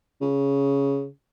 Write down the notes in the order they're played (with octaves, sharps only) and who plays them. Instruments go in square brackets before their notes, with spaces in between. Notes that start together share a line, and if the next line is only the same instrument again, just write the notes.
[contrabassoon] C#3